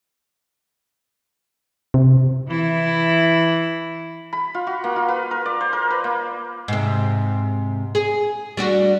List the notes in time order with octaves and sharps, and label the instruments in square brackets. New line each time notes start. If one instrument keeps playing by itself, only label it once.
[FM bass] C3
[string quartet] E3 E4
[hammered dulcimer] B5
F4
F#4
A#3
F4
B4
A#4
D5
C5
A#4
B4
A#3
[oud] G#2 C3
G#4
G3 D4 F#4